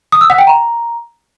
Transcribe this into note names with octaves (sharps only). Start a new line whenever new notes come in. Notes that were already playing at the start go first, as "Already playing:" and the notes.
D#6
E6
F#5
G5
A#5